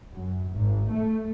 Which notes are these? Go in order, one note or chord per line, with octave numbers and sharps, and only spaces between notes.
F#2
G#1
A3